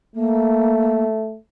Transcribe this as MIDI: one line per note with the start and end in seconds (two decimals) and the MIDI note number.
0.16 1.37 57
0.16 1.05 58